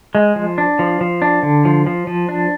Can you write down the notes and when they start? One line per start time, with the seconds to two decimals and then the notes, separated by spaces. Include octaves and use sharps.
0.15 G#3
0.36 F3
0.58 D4
0.79 F3
1.01 F3
1.22 D4
1.43 D3
1.65 F3
1.87 F3
2.07 F3
2.29 D4